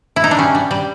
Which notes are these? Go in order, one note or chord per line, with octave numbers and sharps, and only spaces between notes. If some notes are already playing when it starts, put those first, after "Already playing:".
E4
D#4
D4
G3 C#4
G3
G3